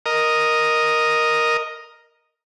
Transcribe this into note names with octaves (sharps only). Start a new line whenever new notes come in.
A#4 D#5